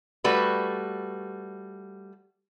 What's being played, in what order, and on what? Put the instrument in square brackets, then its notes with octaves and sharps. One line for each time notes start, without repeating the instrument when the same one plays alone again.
[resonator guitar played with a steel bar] G3 A3 F#4 B4